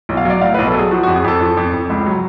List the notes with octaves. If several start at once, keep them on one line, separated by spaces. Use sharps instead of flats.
B1
F5
F#3 D5
A2 F5
B4
B1
A4
F#3 G#4
F3 F#4
F#4
F2
G#4
F2 A4
F3
F2
F2
C#2
F#3